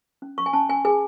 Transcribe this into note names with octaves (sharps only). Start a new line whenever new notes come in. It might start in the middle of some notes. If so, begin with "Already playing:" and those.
C#4
C#4 C#6
G#5
C#4 A5
C#4 G#5
G#4 G#5